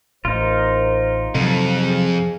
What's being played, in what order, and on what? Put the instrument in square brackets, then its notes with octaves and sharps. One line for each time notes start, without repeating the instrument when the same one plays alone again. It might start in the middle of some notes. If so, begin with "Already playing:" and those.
[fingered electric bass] A1 [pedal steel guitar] D#4 F4 [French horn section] A#4 C5
[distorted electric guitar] F2 [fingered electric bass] C3 F#3 [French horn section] A4
[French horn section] G#4